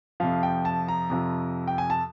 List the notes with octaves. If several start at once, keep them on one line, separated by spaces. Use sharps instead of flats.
F2 C3 F3 F5
G5
A5
A#5
F2 C3 F3
G5
G#5
A5